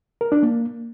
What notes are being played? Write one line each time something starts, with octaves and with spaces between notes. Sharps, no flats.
A#4
D4
A#3